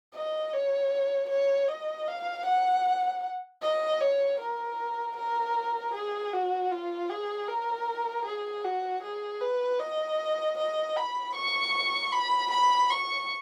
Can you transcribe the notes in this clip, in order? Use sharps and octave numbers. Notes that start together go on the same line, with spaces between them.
D#5
C#5
C#5
D#5
F5
F#5
D#5
C#5
A#4
A#4
G#4
F#4
F4
G#4
A#4
G#4
F#4
G#4
B4
D#5
D#5
B5
C#6
B5
B5
C#6